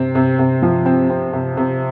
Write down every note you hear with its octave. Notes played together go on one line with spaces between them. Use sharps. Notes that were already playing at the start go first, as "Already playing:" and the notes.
Already playing: C3 C4
C3
C3
F3
C4
C4
C3
C3